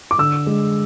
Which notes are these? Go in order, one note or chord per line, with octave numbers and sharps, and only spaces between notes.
D6
D3 E6
G#3